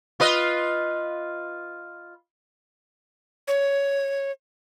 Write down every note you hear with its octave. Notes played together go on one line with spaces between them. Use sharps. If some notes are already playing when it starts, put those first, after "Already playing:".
F4 B4 D#5
C#5